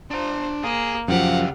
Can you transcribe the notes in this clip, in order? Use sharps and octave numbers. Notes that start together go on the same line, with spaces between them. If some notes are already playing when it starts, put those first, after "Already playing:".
D4 C5 A#5
A#3 G#4
F#2 C#3 F3 G4 F5 F#5